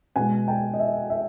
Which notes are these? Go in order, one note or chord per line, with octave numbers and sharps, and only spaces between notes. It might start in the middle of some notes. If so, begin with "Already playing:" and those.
B2 G#3 F#5 G#5
G5 A5
D#5
E5
E5